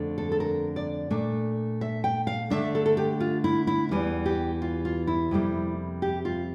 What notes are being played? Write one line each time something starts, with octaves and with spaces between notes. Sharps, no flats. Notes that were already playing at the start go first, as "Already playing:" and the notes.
Already playing: F2 D3 A3 D4
A4
A4
A#4
D5
A#2 A3 D4
E5
G5
F5
D3 A3 D4 E5
A4
A4
G4
F4
E4
E4
E2 E3 G3
G4
F4
F4
E4
F2 C3 G3 A#3
G4
F4